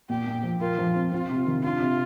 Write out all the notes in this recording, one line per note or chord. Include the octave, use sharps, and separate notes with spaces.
A#2 G4
A#2
F3
F4 A#4
F3
C4
C4 F4
C3
D#3
D4 F4
C3